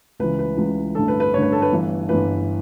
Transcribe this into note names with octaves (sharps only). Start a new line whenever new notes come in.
C#2 C#3 E3 B4
B4
C#2 C#3 E3
A1 G2 D3 A4
B4
B4
A1 G2 D3 C#5
B4
A4
B4
G1 G2 E3
G1 G2 E3 B4